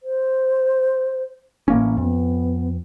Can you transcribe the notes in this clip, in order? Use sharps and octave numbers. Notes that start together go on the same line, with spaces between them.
C5
A1 A#3 C#4
F2 B3